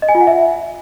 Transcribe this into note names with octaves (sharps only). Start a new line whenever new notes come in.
D#5
G#5
F4
F#5
E5